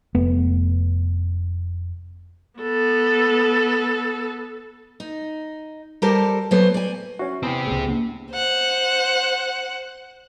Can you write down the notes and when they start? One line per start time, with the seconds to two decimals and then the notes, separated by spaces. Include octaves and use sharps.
0.15 F1 A3 B3
2.60 B3 A4
5.00 D#4
6.02 G3 G4 A4 A#4 C5 A5
6.51 F#3 A3 B3 A4 C5 C#5
6.74 D5 G#5
7.19 C#4 F#4 E5
7.43 E2 C4 G4
7.67 C#2 A2 G#4
7.88 A#3
8.33 C5 F#5